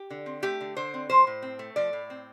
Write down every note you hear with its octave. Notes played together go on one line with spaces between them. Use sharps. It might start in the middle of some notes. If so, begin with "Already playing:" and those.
Already playing: G4
D3
C4
A3 G4
D3
D3 C5
C4
F3 C5
A2
C4
A3
F3 D5
A2
C4